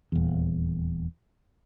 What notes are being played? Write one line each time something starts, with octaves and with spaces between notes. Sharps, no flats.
D#1 E2